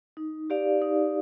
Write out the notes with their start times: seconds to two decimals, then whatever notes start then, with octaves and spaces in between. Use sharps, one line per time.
0.17 D#4
0.50 G4 D5 F5
0.82 D#4